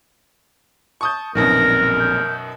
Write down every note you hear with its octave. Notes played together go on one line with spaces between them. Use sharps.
A5 C#6 D#6 G6
A#1 F#2 B2 D3 D#3 C4 A#4 A#6
G6